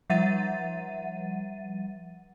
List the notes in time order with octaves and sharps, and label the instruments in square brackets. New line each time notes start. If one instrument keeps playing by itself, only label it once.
[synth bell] F3 G3 E5 F#5 A6 D#7